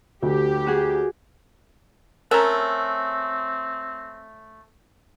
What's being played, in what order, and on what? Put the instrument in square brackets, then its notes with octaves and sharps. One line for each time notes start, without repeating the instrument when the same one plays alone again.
[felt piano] D2 [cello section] G4
[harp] F#4 G#4
[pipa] A3 C#4 E5 [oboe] C4 [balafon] A#4 A#5